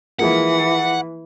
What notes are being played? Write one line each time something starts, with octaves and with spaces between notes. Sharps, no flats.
E3 F3 G#3 A#3 F#5